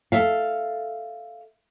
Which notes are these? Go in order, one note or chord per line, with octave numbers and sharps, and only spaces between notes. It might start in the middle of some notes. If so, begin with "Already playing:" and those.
A4 E5 F5